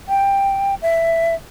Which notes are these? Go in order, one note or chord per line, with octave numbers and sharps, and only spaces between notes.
G5
E5